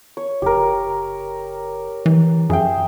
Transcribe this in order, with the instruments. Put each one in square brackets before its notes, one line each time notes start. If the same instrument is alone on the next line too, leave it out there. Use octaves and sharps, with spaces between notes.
[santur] C#5
[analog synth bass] F#1 [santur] G4 A#4
[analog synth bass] E3
[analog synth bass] F#2 [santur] G#4 E5 G5